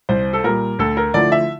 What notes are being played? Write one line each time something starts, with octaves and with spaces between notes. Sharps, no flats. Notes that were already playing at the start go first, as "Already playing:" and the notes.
C2 C5
A4
A#2 G3 A#4
D2 A4
A#4
D3 F3 A3 E4 D5
E5